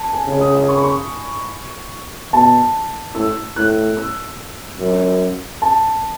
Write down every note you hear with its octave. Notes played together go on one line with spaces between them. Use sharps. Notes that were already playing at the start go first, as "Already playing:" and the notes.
Already playing: A5
G#5
C#3
D#6
C#6
B5
C#6
B2 A5
A2 E6
A2 F#6
E6
F#2
A5